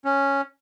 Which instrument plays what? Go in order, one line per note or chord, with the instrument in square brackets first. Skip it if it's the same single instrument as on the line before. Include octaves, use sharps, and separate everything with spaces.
[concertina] C#4